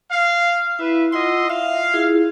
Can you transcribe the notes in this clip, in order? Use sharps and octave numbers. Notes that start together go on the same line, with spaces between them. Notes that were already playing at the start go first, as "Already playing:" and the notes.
F5
E4 B4 E5
F4 D#5 F#5 C6 E6
E5 F5
E4 F4 G#4